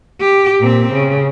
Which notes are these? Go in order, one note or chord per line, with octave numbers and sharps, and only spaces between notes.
G4
A#2 C4
C#3